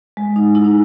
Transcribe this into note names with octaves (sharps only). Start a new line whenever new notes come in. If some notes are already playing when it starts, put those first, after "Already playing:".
G#3
D#4
E4
D#4